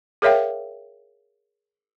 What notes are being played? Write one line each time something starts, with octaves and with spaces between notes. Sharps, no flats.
G#4 A#4 C#5 E5 F5 G5